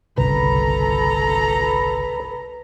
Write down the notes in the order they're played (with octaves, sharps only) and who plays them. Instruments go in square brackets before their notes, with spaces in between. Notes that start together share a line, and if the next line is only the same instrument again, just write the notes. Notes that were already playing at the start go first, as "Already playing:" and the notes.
[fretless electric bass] G1 C2 C#3 [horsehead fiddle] A4 A#5 [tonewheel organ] B4